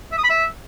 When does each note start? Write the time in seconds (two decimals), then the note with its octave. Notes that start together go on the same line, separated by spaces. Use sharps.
0.12 E5
0.18 D#6
0.24 B5
0.30 E5